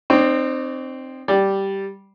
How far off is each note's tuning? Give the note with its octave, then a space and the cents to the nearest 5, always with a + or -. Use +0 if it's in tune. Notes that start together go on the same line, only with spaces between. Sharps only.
C4 +0 D#4 -40 C#5 +45
G3 -5 D5 +0